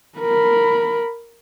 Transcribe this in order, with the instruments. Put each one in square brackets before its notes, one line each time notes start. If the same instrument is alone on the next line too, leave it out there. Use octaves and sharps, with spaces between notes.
[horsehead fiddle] A#4 B5